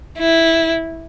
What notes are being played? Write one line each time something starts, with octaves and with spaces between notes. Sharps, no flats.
E4